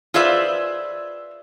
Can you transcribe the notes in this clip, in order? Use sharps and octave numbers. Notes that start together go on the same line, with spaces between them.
F4 G#4 B4 C5 D5 E5